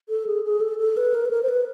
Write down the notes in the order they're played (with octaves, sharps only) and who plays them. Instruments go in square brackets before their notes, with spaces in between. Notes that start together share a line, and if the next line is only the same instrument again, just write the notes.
[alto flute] A4
G#4
G#4
A4
A4
B4
A#4
B4
A#4
C5
B4